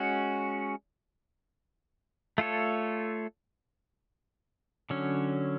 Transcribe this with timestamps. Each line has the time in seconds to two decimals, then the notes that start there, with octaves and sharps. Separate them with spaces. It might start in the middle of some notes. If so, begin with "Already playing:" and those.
Already playing: G#3 C#4 F#4
2.38 A3 F4 A4 C#5
4.90 D3 F#3 C#4